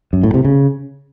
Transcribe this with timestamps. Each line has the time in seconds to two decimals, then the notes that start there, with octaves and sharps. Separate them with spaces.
0.13 F#2
0.23 A2
0.34 C3
0.45 C#3